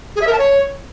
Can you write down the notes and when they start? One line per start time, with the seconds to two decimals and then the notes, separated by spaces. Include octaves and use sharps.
0.16 G#4
0.21 E5
0.27 A#4
0.33 A5
0.38 C#5